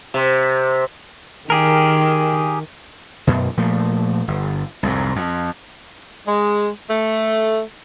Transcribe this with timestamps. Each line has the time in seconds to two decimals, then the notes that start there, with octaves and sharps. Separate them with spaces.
0.14 C3
1.50 D#3 G4 G#4 A#4
3.27 F#2 B2
3.57 A#2 F3 A3
4.28 G1
4.83 C2 F2 G#2
5.16 F2
6.27 G#3
6.89 A3